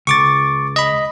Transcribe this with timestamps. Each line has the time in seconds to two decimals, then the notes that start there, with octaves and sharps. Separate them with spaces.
0.07 C#2 C#6 D6 A6
0.76 D#5 B5